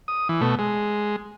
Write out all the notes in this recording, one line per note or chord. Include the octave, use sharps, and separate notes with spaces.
D#6
E3
B2 A3
G#3